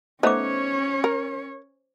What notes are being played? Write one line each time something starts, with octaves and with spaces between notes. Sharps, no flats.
A3 B3 C#4 D#4 C5 C#5 D6
A#4